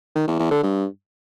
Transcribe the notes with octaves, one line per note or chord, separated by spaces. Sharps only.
D#3
E2
E2
D3
G2